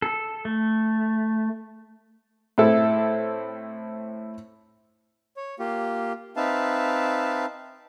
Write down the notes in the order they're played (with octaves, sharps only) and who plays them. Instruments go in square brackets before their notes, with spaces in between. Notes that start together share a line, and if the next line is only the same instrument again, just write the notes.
[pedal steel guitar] A4
A3
[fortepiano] A2 C4 E4 A4
[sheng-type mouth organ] C#5
A#3 F4 G4
C4 D#4 B4 E5 F5 A5